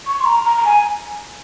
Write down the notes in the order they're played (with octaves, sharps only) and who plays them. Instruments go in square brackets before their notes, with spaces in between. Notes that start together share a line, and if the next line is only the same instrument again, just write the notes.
[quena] C#6
C6
A#5
A#5
A#5
G#5